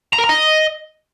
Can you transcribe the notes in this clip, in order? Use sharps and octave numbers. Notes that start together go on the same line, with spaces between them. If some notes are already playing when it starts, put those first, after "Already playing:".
A#5
A#4
A#5
D#5